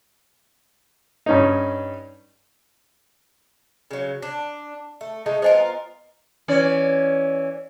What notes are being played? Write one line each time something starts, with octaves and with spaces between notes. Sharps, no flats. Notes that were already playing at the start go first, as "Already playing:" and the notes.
G2 C#4 D#4
C#3 F#3
D4
A3
G#3 A3 D#4
B3 F4 A#4 C5 D#5 G#5
E3 C#4 D5